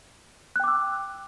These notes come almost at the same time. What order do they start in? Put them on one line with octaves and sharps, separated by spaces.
F#6 G5 D6 E6